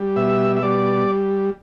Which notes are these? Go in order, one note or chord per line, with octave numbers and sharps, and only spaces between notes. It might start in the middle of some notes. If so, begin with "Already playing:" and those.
Already playing: G3
B2 E5
E5
G3 D5